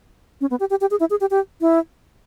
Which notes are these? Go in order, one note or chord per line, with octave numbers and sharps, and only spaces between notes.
C#4
B3
G4
G4
G4
G#4
E4
G#4
G4
G4
E4